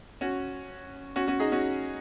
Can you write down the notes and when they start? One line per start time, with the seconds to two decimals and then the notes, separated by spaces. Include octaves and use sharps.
0.21 C#4 F#4
1.16 C#4 F#4
1.27 C#4 F#4
1.39 D#4 G#4
1.52 C#4 F#4